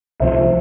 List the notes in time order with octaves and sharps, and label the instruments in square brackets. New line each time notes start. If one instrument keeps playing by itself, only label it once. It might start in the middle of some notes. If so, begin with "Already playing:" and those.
[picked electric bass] C2 C3 F3 [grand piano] C5 E5